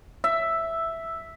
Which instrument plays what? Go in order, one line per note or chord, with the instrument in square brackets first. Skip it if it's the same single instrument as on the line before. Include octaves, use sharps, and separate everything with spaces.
[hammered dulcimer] E5